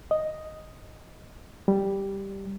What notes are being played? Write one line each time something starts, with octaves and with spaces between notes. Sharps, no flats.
D#5
G3